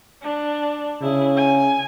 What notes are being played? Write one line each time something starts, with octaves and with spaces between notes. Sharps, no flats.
D4
C#3 E4 G#4
G#5